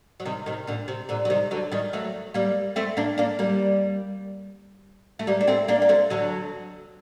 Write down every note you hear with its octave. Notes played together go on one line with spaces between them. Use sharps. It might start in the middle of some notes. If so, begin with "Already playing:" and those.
F#3
C3 D#3
C3 D#3
A#2 D3
C3
A#2 D3
F#3
C3 D#3
D3 F#3
D#3 G3
F#3 A3
G3 A#3
A3 C4
A#3 D4
A#3 D4
G3 A#3
A3
G3 A#3
D4
A3 C4
A#3 D4
A#3
A3 C4
D3 F#3